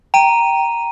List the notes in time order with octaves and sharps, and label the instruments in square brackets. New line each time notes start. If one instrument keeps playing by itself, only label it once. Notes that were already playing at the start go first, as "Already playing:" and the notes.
[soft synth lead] G5 [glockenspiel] A#5 D#7